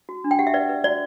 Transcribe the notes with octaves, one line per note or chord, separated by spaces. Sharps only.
F#4
D4
G5
G4 F#5
E5
B4 D5
B4
F#4 D5